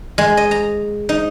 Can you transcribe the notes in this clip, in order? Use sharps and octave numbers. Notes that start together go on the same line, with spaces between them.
G#3
D#5
A#5
D#4